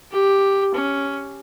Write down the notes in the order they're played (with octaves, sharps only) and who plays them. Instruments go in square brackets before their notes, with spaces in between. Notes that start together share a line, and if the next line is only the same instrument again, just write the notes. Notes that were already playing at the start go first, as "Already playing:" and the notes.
[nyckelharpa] G4
C#4